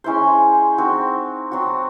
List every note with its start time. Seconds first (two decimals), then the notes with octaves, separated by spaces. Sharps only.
0.04 G#3 C#4 E4 C5
0.78 C4 D#4 F#4
1.51 F#3 C4 F#4